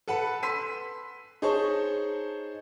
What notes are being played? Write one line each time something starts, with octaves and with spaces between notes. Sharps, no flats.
A4 B4 F#5 A5 B5
B5 C6 E6 B6 D#7
D#4 G#4 C5 C#5 A5 C#6